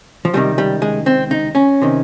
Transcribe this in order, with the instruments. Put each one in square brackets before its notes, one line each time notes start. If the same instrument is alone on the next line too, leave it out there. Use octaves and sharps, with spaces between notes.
[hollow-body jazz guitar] F3
C#2 C3 D#3 G3
G3
G#3
C4
D#4
C#4
C3 D#3